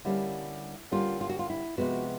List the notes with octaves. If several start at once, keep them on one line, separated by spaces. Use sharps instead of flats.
D3 G3 A#3 C#4 E4
D3 G3 A#3 C#4 F4
F4
F#4
F4
E4
C3 F3 G#3 B3 F#4